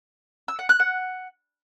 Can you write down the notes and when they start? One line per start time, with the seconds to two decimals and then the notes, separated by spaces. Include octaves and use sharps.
0.48 E6
0.59 F#5
0.69 F#6
0.80 F#5